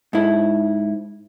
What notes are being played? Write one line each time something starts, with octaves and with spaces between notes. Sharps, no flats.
G#2 E4